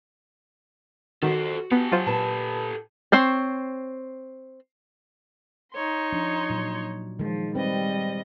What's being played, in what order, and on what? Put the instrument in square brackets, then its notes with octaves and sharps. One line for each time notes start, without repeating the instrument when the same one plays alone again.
[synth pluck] D#3 [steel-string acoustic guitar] F#4 [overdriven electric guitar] A4 C5
[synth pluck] B3 [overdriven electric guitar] G4 A4
[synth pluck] F#3 F4 C5
[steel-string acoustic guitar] A#2 B4 A5
[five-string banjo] C4 C5 C#5
[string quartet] D#4 C#5 C6
[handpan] F3 D4
A#2 F#3
[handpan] D#3 G#3 [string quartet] F3
[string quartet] G3 D#5 [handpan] C4 B4